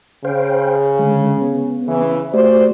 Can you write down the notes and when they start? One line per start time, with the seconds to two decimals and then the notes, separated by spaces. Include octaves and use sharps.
0.25 C#3 C5 F5 G5
0.99 D3 G#3
1.41 B3
1.87 C#3 E3
2.34 A3 F#4 G4 C5 D5